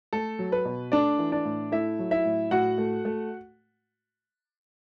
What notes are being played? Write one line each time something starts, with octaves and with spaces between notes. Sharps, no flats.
A3 A4
F#3
B4
B2
A3 D4 D5
E3
D4 D5
A2
A3 E4 E5
F#3
E4 E5
A2
A2 F#4 F#5
A3
A3